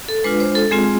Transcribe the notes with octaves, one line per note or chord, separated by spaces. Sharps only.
A4
G#3 D4 F4 B4
C5
A4
G#3 C4 F4 G#4